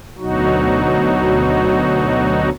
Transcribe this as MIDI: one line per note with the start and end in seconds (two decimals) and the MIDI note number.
0.18 2.50 38
0.18 2.50 47
0.18 2.50 54
0.18 2.50 63
0.18 2.50 66